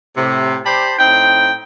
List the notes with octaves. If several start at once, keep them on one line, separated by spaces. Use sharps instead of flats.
A2 C3
G4 C5 D5 A5 B5
A2 C4 D#4 G5